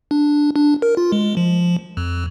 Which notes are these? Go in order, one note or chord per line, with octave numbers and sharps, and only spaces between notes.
D4
D4
A#4
F4
G#3
F3
F2